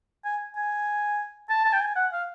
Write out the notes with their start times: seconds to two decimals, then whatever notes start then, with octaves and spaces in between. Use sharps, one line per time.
0.25 G#5
0.56 G#5
1.50 A5
1.65 A5
1.73 G5
1.81 G#5
1.96 F#5
2.12 F5